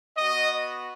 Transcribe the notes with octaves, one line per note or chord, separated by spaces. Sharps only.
B3 F#4 D#5